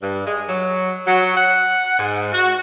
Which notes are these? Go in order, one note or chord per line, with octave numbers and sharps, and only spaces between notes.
G2
G#3
F#3
F#3
F#5
G#2
F#4